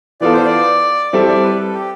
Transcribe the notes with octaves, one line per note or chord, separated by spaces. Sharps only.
E3 B3 F4 A4 D5
C5
D5
G3 C4 E4 A4 D5 E5
D5
B4
A4
G4